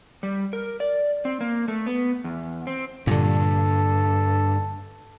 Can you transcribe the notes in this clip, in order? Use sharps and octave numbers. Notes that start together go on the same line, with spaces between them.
G3
A#4
D5
C4
A#3
A3
B3
E2
C4
G2 A#2 D3 A4